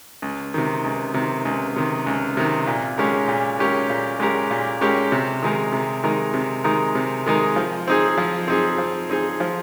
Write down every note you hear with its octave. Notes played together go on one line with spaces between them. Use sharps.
C#2
C3 D#3
C#2
C3 D#3
C#2
C3 D#3
C#2
C3 D#3
A#2
G#3 C#4 G4 A#4
A#2
G#3 C#4 G4 A#4
A#2
G#3 C#4 G4 A#4
A#2
G#3 C#4 G4 A#4
C3
D#3 G#3 D#4 A#4
C3
D#3 G#3 D#4 A#4
C3
D#3 G#3 D#4 A#4
C3
D#3 G#3 D#4 A#4
F3
C4 D#4 G#4
F3
C4 D#4 G#4
F3
C4 D#4 G#4
F3